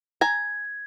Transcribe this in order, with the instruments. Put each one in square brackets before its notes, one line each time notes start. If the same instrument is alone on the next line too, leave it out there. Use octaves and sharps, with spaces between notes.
[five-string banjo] G#5 A#5 [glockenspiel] G#6